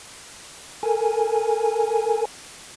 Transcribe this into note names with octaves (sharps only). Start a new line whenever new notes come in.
A4 A#4 G#5